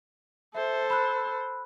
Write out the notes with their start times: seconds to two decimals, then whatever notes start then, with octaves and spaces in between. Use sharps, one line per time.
0.55 A4 C5 E5
0.90 B5 E6 F#6